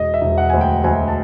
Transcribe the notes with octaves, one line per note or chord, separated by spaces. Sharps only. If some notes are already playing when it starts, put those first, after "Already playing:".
Already playing: E1 D#5
E5
E1
F#5
D2 G#5
G5
D2 G#5
A5